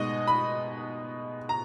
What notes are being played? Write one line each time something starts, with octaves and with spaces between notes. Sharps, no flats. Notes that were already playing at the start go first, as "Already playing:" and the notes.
Already playing: B2 G#3 D#4 D#5
B5
A#5